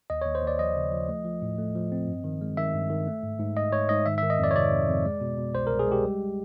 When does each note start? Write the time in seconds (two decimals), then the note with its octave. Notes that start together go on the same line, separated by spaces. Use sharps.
0.10 D#2 D#5
0.22 D#2 C#5
0.35 C5
0.43 D#2 D5
0.59 F3 D#5
0.76 C#3
0.92 F3
1.09 A3
1.25 F3
1.42 A2
1.58 A3
1.75 F3
1.92 C4
2.07 G2
2.24 D#3
2.41 G#3
2.57 D#3 E5
2.74 G2
2.90 D#3
3.07 A3
3.23 G#2
3.40 G#2
3.57 G#2 D#5
3.72 G#2 C#5
3.89 G#2 D#5
4.06 D#3 E5
4.18 D#3 E5
4.30 D#5
4.39 F2 D5
4.51 C#5
4.55 C3 D5
4.72 F2
4.89 F2
5.05 G#3
5.21 B2
5.38 B2
5.55 C2 C5
5.67 C2 A#4
5.79 G#4
5.88 G#3 G4
6.04 G3